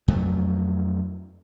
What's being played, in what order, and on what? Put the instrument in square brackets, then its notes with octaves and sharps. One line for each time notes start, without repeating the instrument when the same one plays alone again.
[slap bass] F2 F#3 A3